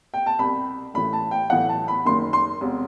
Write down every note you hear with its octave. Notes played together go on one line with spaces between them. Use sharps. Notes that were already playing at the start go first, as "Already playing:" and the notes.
G5
A5
C2 B2 B5
A1 A2 E3 B5
A5
G5
B1 A2 E3 F#5
A5
B5
F#1 F#2 D#3 C6
C6
E1 C3